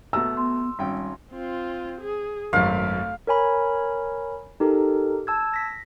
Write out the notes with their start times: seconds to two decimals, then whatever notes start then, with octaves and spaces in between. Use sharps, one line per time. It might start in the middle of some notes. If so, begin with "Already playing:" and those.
0.13 B2 A3 A#5 E6
0.37 B3 C6
0.79 G#1 G3 C#4 G5
1.32 C4 F4
2.01 G#4
2.53 G#1 F#2 A3 F5
3.27 A#4 C#5 G#5 B5
4.60 D#4 G4 A4 A#4
5.27 A5 E6 G#6
5.54 A#6 B6